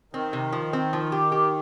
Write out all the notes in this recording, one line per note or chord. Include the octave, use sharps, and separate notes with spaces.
D#3 C4
C3
F3
C4
F3
G4
G4